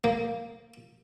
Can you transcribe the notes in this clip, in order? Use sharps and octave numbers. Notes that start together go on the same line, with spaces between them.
A#3